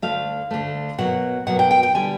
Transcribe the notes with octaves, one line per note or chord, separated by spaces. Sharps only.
D2 D3 F#3 A3 F5
D2 D3 F#3 A3
B2 F#3 A#3 F#5
B2 F#3 A#3 F#5
G5
G5
G5
D3 G3 B3 G#5